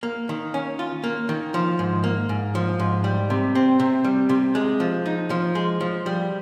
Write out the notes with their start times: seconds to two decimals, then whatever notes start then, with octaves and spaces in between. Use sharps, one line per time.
0.03 A#3
0.29 D#3
0.54 C#4
0.79 F4
1.04 A#3
1.29 D#3
1.54 F3
1.79 G#2
2.04 A#3
2.29 G#2
2.55 F3
2.80 G#2
3.04 G3
3.30 C3
3.55 C4
3.80 C3
4.04 G3
4.29 C3
4.55 G#3
4.80 F3
5.06 D#4
5.30 F3
5.55 G#3
5.81 F3
6.06 G3